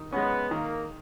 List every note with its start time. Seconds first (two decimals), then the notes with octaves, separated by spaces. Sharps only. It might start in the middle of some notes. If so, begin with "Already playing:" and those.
Already playing: D#3
0.12 G#3 B3 C#4
0.51 D#3 A#3